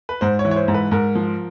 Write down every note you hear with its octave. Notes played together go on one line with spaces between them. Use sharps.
B4
G#2 C5
C#5
E3
C#5
C5
G#2
B4
G#2 A#4
F3